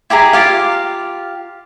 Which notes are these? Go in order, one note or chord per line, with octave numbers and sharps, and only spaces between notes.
E4 G4 G#4 A#5
F4 G4 F5